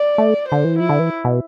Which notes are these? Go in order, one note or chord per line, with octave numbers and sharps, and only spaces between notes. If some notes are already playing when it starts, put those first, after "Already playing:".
Already playing: D5
A3
D3 C5
E3
F3 E4
D3
E3
B2